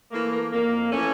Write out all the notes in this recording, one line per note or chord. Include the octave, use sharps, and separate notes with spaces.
E3 A3 A#3
A#3
F2 A#3
E3 A3 C#4